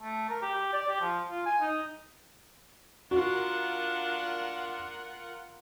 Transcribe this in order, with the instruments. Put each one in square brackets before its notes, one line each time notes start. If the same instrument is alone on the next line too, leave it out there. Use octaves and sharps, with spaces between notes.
[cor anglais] A3
A#4
G4
G4
D5
G4
F3
F4
G#5
D#4
[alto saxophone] D4 [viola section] F4 A#4 F#5 [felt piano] F#4